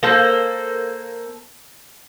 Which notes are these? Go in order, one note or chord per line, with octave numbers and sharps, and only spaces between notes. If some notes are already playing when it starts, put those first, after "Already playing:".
A#3 A4 C5